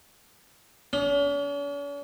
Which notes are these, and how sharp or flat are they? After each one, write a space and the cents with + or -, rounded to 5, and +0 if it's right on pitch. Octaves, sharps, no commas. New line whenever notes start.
C#4 +45